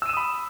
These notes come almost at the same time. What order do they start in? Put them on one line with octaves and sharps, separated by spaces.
E6 D#7 E7 D#6 B5